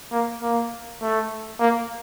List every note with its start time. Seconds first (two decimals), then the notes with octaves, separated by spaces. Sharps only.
0.12 A#3
0.42 A#3
1.02 A3
1.60 A#3